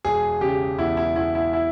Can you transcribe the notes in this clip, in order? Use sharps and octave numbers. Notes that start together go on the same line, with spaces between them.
E1 G#4
C#3 G4
E2 E4
E4
E2 E4
E4
E4